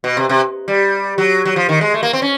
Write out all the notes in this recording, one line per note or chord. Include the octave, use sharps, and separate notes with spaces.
B2
C3
C3
G3
F#3
F#3
F3
D#3
G#3
A3
A#3
C4
C#4